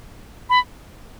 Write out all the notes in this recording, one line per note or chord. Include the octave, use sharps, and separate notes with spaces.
B5